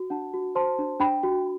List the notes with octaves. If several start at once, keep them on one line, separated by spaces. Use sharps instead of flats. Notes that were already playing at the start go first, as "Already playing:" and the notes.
Already playing: F#4
D4 F#5 A5
F#4
C5 A5 C6
D4
D4 G5 B5
F#4